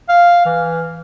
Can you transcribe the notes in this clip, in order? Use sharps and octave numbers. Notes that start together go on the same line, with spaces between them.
F5
E3